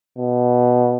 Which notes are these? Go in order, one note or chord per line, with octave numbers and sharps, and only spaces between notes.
B2